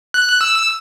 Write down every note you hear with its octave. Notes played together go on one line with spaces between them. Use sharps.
F#6
E6